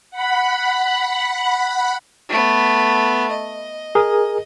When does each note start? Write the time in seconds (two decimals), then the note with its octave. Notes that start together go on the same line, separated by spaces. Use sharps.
0.11 F#5 B5
2.29 A3 B3
3.31 D#5
3.95 G#4 A#4